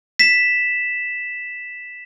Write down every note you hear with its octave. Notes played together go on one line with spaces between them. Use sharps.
B6 E7